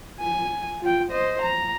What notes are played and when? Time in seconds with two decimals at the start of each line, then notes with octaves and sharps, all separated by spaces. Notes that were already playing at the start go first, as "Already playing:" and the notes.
0.20 G#5
0.81 F4 G5
1.11 C5 D#5
1.42 A#5